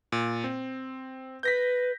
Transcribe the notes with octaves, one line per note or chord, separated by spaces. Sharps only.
A#2
C4
B4 G6 A#6 B6